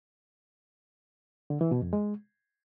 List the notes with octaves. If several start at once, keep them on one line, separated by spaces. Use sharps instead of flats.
D3
E3
B2
F2
G#3